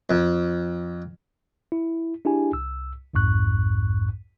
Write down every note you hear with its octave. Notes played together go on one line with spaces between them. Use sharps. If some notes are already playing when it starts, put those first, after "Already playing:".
F2
E4
D4 E4 G4 G#4 G#5
C2 E6
B1 F2 G#2 C#6 F#6